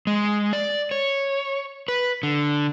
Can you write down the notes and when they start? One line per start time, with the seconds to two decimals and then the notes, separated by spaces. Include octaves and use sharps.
0.07 G#3
0.53 D5
0.91 C#5
1.88 B4
2.23 D3